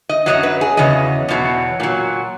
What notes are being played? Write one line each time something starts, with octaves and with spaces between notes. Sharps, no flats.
D#5
F#2 C#3 F#3 D#5
B4
G#4
E2 C#3 F#3 D#5
E2 B2 F#3
A#2 F#3